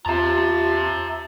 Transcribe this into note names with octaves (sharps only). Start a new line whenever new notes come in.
E2 F4 E5 A5 A#5